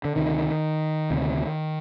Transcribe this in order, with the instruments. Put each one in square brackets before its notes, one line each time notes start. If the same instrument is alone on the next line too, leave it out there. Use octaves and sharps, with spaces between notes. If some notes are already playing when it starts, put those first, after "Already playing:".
[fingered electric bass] D3
D2 C3 D#3
D2 C3